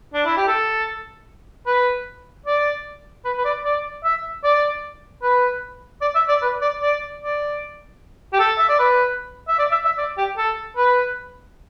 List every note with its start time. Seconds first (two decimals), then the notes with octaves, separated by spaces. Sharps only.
0.14 D4
0.26 E4
0.37 G4
0.48 A4
1.67 B4
2.46 D5
3.25 B4
3.38 B4
3.45 D5
3.65 D5
4.05 E5
4.44 D5
5.22 B4
6.02 D5
6.15 E5
6.29 D5
6.42 B4
6.62 D5
6.82 D5
7.22 D5
8.33 G4
8.39 A4
8.58 E5
8.69 D5
8.79 B4
9.49 E5
9.59 D5
9.72 E5
9.85 E5
9.98 D5
10.18 G4
10.38 A4
10.77 B4